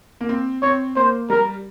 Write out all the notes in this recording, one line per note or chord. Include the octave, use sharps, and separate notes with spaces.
A#3
C4
C4 C#5
A#3 C5
G3 A#4